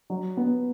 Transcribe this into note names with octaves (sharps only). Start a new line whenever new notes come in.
F#3
B3